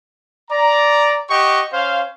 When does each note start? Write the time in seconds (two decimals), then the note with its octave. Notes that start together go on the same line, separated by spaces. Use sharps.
0.50 D5 A#5
1.29 G4 D#5 F#5 C#6
1.73 C#4 C5 F5